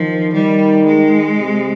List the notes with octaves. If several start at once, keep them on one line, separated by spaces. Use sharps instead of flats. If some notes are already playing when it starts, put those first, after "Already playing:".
Already playing: D#3 F3
D#3 G3
G#3
C3